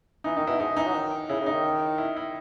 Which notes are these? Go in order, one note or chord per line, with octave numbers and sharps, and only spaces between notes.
E3 D#4
D#3 D#4
B2 E4
G#2 D#4
E3 D#4
F#3
D#3
C#3 E4
C#3
D#4
D#3
E4
E4